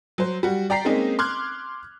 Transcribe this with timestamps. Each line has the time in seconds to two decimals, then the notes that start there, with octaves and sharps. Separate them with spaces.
0.18 F#3 C5
0.43 G3 F#4
0.70 D5 G5 A#5 B6 C7
0.85 G#3 A#3 C4 C#4 D#4
1.19 C6 D6 F6 F#6 G#6